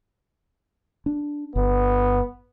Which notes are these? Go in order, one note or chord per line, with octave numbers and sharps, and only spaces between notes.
D4
G1 B3